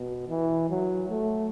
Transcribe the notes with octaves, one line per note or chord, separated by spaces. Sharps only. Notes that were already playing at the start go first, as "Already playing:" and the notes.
Already playing: B2
E3
F#3
A3